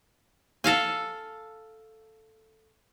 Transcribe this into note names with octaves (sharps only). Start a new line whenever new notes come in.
A4 F5 G#5